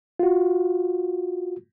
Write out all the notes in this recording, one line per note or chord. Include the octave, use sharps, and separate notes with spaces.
F4 F#4